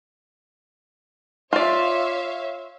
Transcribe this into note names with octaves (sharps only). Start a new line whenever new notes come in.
F4 C#5 D5 E5 F5